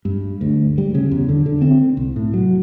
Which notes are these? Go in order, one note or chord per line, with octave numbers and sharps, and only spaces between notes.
G2
D2
G3
C#3
E2
D3
D3
C4
C2
A2
F#3